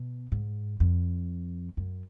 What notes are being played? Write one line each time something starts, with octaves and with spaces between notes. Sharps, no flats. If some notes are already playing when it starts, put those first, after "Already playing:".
Already playing: B2
G#2
F2
F#2